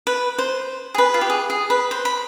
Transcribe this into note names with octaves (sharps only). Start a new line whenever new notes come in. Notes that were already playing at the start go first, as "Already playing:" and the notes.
B4
C5
G#4
B4
F4
G4
G#4
G#4
B4
C5
B5